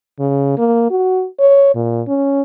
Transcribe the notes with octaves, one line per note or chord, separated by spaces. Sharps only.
C#3
A#3
F#4
C#5
A#2
C#4